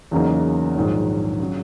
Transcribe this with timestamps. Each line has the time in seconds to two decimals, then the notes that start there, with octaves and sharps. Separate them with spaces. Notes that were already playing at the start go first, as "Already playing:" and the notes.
0.11 E2 C#3 F#3 A#3 D#4
0.76 A#1 G#2 D#3 F#3
1.40 C#3 F#3